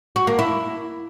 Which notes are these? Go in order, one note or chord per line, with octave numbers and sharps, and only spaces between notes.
F#4
A#3
E4